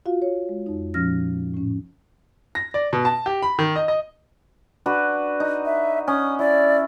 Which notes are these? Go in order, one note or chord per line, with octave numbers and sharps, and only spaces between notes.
F4 F#4 F5
C#5
G#3
F2 D#4
A#2 F3 C#4 F6 A#6
A2 C#4
A#6
D5
B2
A5
G4
B5
D#3
D#5
D#5
D4 F#4 B4
D#4
E5
C#4 D#6
E4 D5